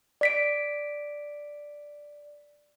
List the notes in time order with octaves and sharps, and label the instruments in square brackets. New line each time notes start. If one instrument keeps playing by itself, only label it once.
[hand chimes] D5 B6 D7